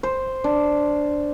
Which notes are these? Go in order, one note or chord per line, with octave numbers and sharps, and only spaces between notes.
C5
D4